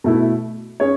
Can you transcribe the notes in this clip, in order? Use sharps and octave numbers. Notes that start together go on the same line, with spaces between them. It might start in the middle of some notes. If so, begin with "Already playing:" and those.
B2 A3 E4
C#4 G#4 C#5